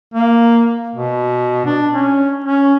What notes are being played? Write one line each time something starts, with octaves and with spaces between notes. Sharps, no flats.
A#3
B2
D4
C#4
C#4